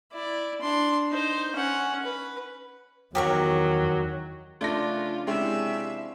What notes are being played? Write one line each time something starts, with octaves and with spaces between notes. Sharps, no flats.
E4 D5
D4 C6
D#4 C5
C#4 F#5
B4
E2 D#3 F#3 G4 A#4 C#6
C#3 F3 A3 D4 F4 A#6
C3 G#3 C4 C#4 E4 E5